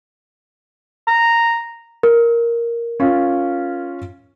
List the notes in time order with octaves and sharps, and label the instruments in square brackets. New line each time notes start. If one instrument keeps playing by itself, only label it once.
[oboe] A#5
[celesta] A#4
[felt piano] C#4 F4